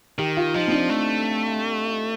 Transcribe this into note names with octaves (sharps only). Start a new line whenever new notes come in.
D#3 G4
F4
F3 D#4
C4
D4
A3